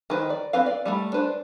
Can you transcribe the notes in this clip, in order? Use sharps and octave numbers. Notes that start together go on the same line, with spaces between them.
D#3 B4 C5
D5
B3 C4 B4 F5
D5
G3 A3 B5
D4 B4 C5